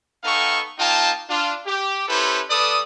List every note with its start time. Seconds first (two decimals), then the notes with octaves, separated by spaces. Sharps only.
0.24 B3 D#4 A4 F5 G5 C#6
0.78 A#3 D#4 F4 G5 A5
1.29 D4 F4
1.66 G4
2.08 C#4 E4 G4 A4 B4 C5
2.50 G3 A4 B4 D5 D#6